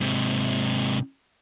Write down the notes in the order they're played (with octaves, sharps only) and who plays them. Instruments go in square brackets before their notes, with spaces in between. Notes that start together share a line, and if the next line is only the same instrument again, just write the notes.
[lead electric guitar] G#2 C3